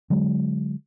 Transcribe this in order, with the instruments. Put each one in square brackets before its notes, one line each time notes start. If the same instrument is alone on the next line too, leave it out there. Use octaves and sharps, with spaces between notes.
[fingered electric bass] D3 F#3 G#3